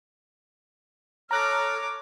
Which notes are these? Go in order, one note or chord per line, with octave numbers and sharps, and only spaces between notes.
A4 C#5 A#5 D6 F6 F#6 A#6